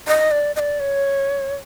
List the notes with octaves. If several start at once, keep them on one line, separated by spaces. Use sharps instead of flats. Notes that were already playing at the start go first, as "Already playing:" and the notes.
D#5
D5
D#5
D5
C#5